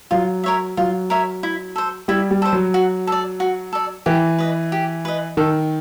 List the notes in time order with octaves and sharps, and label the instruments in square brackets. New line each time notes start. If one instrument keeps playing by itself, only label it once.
[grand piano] F#3 [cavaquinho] F4
[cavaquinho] A#4 C#5 E5
[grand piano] F#3 [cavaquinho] F4
[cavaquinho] A#4 C#5 E5
E4
A4 C5
[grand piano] G3 [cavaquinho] E4
[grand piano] G3
[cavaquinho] A4 C5
[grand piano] F#3
[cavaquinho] F#4
A4 D5
F#4
A4 D5
[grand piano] E3 [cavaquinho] G4
[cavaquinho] B4 D#5
G4
B4 D#5
[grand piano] D#3 [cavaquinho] A4